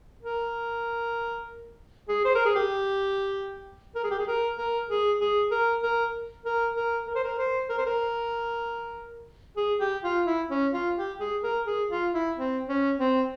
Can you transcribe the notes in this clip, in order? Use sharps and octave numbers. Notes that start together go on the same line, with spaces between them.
A#4
G#4
C5
A#4
G#4
G4
A#4
G#4
G4
G#4
A#4
A#4
G#4
G#4
A#4
A#4
A#4
A#4
A#4
C5
A#4
C5
A#4
C5
A#4
G#4
G4
F4
E4
C#4
F4
G4
G#4
A#4
G#4
F4
E4
C4
C#4
C4